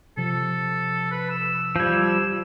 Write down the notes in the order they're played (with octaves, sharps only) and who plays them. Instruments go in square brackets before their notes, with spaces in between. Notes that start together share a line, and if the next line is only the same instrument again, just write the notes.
[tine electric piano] C3 F3 [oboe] A4
[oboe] B4
E6
[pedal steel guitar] F3 G3 [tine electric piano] G6 G#6